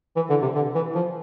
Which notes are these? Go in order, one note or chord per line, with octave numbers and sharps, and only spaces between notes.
E3
D3
C3
D3
E3
F3